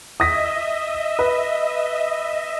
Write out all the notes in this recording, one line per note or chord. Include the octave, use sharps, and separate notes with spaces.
D#5 E5 D#6 A#6 B6
B4